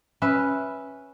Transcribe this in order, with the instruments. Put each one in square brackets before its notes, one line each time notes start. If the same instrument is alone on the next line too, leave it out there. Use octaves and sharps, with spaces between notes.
[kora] C#4 B4 E5